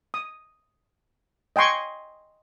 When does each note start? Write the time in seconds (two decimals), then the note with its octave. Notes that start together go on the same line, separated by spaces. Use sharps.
0.14 D#6
1.56 D#5 G5 G#5 C6 C#6